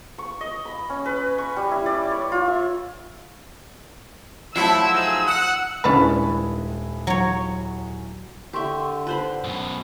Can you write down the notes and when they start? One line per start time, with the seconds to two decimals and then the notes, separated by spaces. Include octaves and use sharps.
0.18 C#6
0.41 D#5
0.65 B5
0.90 C#4
1.06 B4
1.38 C#6
1.56 G3
1.71 E4
1.86 D5
2.11 C#5
2.32 F4
2.47 E5
4.56 F3 F#3 A3 E4 E5 E6
4.92 D#4 G#4 C5
5.26 F#5
5.84 D#1 G#3 C#4 D4 E4 B4
7.07 F#3 C#5
8.53 D3 G4 A#4 E5 C6 C#6
9.07 D#4 F4 B4 C5 B5
9.44 F#2 B2